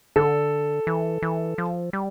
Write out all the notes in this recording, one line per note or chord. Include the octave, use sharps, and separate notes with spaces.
D3 A4
E3
E3
F3
G3